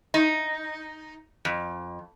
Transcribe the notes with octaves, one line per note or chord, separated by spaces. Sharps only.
D#4
F2